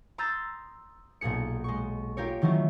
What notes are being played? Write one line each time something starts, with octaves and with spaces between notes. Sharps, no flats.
A#5 C6 D#6 E6 G6 A6
B1 A#2 A#3 G#4 C#7
G#3 C#6
F4 G4 A#4 C#5
D#3 E3 F#3 A3 C#4 F4